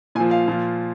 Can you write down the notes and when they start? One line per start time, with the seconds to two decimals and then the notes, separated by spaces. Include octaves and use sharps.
0.15 A#2 G#5
0.20 F3
0.31 F5
0.48 A#2 F3